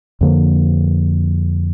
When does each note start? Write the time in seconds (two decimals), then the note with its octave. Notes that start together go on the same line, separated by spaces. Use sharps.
0.21 F2 D3 F3 A#3